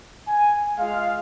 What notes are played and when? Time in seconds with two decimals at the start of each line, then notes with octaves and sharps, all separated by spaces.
0.28 G#5
0.79 G#3 F4 F5